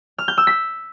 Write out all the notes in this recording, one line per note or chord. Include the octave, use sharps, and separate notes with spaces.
F6
G6
E6
B6